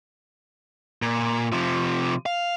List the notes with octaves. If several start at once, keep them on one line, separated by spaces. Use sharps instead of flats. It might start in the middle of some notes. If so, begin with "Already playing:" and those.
A#2
C3 F3
F5